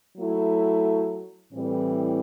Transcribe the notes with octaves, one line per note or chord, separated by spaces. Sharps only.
F#3 A3 E4
A2 E3 G3 C4